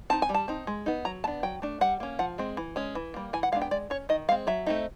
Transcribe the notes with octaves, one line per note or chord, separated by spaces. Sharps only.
C4 D#4 A5
G#5
G3
A5
C4 D#4
G#3
B3 D#4
F#3 A#5
B3 D4 A5
F#3 G5
A3 D4
G3 F#5
A#3 C#4
F3 F#5
G#3 C4
E3
G#3 C#4
E3
G3 A#3
E3 G#5
F#5
G#3 B3 D4 F5
G5
G#3 D5
C#4 C#5
D#3 D#5
G#3 C4 F5
F#3 E5
A3 C4 D#4